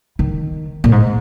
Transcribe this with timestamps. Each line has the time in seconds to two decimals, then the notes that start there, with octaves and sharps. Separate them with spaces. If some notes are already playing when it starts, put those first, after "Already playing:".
0.19 D#3
0.84 A#2
0.92 G#2